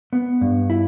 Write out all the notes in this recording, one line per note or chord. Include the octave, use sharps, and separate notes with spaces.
B3
G2
E4